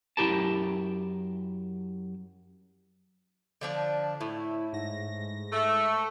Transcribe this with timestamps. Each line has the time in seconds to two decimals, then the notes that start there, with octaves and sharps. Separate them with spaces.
0.17 F#2 F3 E4 G4 A#4 A5
3.61 D3 F3 D4
4.21 A2 E4
4.73 G#2 A#6
5.52 A3